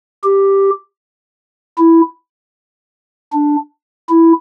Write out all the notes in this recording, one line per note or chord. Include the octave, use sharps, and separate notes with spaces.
G4
E4
D4
E4